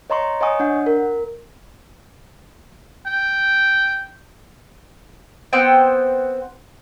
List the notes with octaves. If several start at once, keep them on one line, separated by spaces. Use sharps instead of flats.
C#5 D#5 A#5 C6 C#6
C#5 D#5 F#5 G#5 C#6 D#6
D4 F#5
A#4
G5
B3 C4 C5 G5